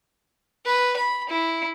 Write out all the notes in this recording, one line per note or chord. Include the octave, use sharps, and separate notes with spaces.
B4
B5
E4